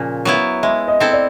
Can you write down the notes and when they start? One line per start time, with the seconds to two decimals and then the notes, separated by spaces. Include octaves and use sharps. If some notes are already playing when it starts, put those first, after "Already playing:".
Already playing: A#2 C#3 F3 C#4
0.25 F#3 B3 E4
0.63 G#3 E5
0.88 D#5
1.00 C4 E4 A4
1.13 D5